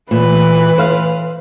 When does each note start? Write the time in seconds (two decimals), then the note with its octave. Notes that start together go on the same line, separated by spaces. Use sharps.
0.11 A#2 E3 B4
0.78 C5 F5